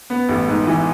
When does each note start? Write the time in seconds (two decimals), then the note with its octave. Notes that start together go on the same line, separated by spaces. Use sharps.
0.10 B3
0.29 A1
0.48 G#2
0.67 E3